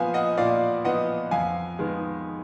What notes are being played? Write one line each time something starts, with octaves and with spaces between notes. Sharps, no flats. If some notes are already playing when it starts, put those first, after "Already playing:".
Already playing: A#2 F3 B3 F5 G#5
D#5 F#5
A#2 D5 F5
F3 B3 D#5 F#5
F2 F5 G#5
D#3 G#3 B3